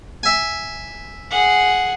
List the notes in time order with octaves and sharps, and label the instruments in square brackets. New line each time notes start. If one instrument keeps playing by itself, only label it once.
[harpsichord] E5 G#5
[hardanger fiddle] G#4 F#5